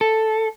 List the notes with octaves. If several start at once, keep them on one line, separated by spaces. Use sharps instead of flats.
A4